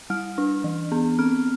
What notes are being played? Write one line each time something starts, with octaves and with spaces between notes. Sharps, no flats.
G3 F6
D4
E3
B3
C4 F6